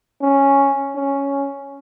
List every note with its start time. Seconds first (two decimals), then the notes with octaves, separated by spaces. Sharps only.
0.22 C#4
0.96 C#4